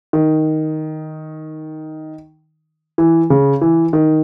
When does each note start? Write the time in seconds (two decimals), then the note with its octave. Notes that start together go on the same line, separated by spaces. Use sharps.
0.13 D#3
2.98 E3
3.30 C#3
3.61 E3
3.93 D#3